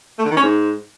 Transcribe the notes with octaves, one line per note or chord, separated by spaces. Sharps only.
A3
D3
D#3
C#4
G#2